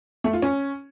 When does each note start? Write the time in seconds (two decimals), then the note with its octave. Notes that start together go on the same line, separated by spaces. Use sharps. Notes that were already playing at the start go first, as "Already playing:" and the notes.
0.24 A3
0.33 F4
0.42 C#4